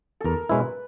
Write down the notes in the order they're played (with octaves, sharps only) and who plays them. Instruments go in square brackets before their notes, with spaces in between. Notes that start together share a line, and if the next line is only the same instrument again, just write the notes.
[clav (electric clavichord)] E2 [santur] A4 A#4
[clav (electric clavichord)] B2 G#3 C#4 E4 [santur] B4